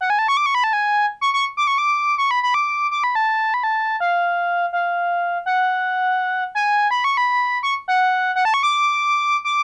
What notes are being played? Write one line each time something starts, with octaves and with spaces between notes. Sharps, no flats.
F#5
G#5
A5
C#6
D6
C#6
B5
A5
G#5
C#6
C#6
D6
C#6
D6
C#6
B5
B5
D6
D6
B5
A5
B5
A5
F5
F5
F#5
G#5
B5
C#6
B5
C#6
F#5
F#5
A5
C#6
D6
D6